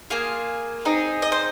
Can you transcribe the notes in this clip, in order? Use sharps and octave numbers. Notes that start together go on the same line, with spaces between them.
A#3 F4 G#4
C4 D#4 G#4
D#5
C5